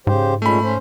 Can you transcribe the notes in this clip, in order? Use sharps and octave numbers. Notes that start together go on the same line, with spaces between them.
G#2 C#3 G4 C5
A#2 G#3 A3 C#4 B5
C#4 C5